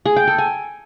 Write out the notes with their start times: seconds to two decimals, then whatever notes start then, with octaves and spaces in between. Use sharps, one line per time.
0.06 G#4
0.16 G5
0.27 A4
0.38 G#5